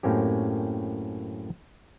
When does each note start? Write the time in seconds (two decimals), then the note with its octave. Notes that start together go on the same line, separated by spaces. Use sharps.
0.03 F#2 A2 A#3 C4 C#4 G4